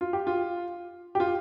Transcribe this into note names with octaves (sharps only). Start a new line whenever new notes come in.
F4
G4
F4
G4
F4